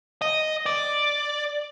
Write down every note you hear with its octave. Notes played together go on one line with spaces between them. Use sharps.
D#5
D5